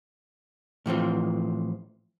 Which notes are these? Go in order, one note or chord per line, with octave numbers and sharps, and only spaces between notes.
A2 E3 F3 C4